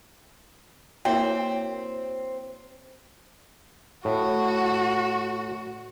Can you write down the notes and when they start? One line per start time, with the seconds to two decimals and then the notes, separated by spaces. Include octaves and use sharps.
1.05 A#3 C4 E4 F#4 A#4 C#5 E5 G5
4.05 A2 F#4